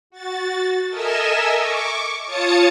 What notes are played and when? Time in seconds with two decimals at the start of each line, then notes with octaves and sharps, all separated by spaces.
0.10 F#4 A6
0.88 A4 A#4 D#5 E5 G#5 E6
1.59 C#6 D6
2.26 F4 C#5 A5 D#6 A6 C#7